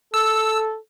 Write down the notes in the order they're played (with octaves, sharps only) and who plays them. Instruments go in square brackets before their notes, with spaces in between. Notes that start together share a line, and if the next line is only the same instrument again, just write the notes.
[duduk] A4 [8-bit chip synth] E6